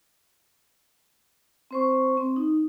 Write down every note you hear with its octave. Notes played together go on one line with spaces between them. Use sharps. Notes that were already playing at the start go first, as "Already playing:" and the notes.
C4 C5 C#6
C4
D#4